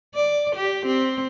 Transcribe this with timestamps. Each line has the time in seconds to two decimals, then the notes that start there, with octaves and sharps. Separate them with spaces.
0.15 D5
0.56 G4
0.86 C4